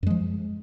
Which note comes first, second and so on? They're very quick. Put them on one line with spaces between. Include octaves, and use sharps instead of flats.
F#2 G#3 F3